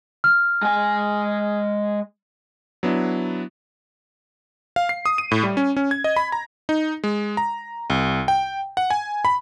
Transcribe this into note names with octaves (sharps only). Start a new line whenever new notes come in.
F6
G#3 G#5
F#3 B3 D4 E4
F5
C7
D#6
D#7
A2
G3
C#4
C#4
G#6
D#5
B5
A#5
D#4
G#3
A#5
C2
G5
F#5
G#5
B5